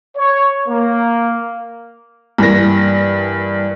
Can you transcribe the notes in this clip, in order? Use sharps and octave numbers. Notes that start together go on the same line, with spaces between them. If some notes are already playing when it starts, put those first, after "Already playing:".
C#5
A#3
G2 E3 A#3 A#6